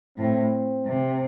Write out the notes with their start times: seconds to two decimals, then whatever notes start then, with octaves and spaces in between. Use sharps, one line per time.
0.18 A2 C4
0.86 C3